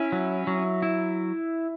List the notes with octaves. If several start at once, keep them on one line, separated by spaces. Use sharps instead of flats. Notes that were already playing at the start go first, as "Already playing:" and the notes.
Already playing: C#4 E4
F#3
F#3
E4